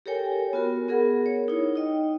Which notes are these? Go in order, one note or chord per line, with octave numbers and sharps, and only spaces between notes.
G4 A4 A#4 C#5 G5 G#5
B3 F4 F#4 A#4
B3 G#4 A#4 F#5
C#5
D#4 E4
D#4 D#5 G5